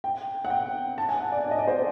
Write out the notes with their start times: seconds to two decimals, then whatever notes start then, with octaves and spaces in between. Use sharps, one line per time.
0.04 G5
0.45 F#5
0.50 G5
0.98 A5
1.09 G#5
1.20 F#5
1.32 D5
1.44 D5
1.51 D#5
1.59 D5
1.67 C5